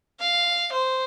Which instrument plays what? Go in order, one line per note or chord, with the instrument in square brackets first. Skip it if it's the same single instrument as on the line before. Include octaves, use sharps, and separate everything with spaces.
[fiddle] F5
C5